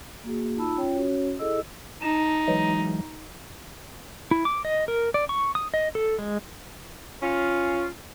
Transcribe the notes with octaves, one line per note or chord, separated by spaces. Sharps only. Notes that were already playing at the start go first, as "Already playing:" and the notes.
A#3 F#4 G#4
D#4 F4 A5 B5 E6
C#4 F4 C#5 G5
C#4 F#4 C#5
E4 G#4 A4 D#5 E6
D#4 A5
E3 F#3 G#3
E4
D6
D#5
A#4
D5
C#6
D#6
D#5
A4
G#3
C#4 F4